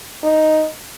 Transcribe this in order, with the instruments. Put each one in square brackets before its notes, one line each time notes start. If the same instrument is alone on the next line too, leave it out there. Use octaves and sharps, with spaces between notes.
[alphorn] D#4